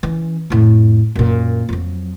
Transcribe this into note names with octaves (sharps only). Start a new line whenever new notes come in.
E3 C#4
F2 A2
F#2 A#2
F2 F#3